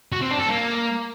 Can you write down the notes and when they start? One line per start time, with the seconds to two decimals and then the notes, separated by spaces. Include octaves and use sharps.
0.12 F#4
0.21 C4
0.30 D4
0.39 A4
0.48 A#3